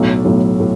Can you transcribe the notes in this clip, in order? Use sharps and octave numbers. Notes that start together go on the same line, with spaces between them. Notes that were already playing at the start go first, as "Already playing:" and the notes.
Already playing: B1 A2 F#3
B1 A2 F#3
A2